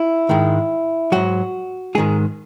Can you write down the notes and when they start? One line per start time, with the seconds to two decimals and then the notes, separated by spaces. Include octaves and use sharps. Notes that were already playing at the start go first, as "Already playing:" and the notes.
Already playing: E4
0.29 G#2 D#3 G#3
1.12 G#2 F#3 F#4
1.95 G#2 D#3 G#3 G#4